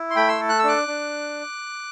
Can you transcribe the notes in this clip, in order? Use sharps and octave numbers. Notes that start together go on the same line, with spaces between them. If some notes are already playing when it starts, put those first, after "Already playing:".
Already playing: E4
C6
A3 G5 B5
C6 E6
A4
F#6
E6
D4 D6 F#6
D4